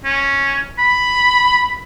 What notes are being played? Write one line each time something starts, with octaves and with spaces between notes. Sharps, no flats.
C#4
B5